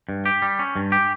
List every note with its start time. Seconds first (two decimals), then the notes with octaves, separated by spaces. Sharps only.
0.09 G2
0.26 G4
0.42 G3
0.59 C#4
0.76 G2
0.92 G4